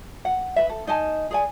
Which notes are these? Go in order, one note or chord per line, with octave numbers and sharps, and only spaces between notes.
F#5
B4 E5
A4
D#4 D#5 G#5 A5
G#4 D5 G#5